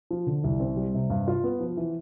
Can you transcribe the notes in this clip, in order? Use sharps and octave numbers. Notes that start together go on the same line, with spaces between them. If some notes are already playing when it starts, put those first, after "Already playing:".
F3
D3
C2
C4
G3
C3
G2
F4
B3
F3
E3